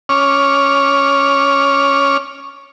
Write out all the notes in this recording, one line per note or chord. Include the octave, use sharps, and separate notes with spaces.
C#4 C#5 D6 F6